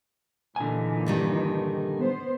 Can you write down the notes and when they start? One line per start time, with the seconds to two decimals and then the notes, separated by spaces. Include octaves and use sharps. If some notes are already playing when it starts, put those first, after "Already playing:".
0.56 A#2 D3 E3 D#4 G#5
1.06 G2 D#3 G3
1.97 B3 C5